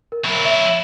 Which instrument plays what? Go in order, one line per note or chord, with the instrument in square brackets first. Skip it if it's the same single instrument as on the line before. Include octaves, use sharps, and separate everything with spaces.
[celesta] A#4
[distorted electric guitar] F#3 E4
[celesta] E5